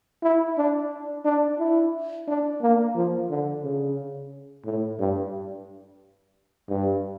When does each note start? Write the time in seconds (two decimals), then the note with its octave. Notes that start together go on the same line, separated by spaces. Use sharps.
0.23 E4
0.58 D4
1.25 D4
1.59 E4
2.28 D4
2.62 A#3
2.96 F3
3.30 D3
3.64 C#3
4.65 A2
5.00 G2
6.69 G2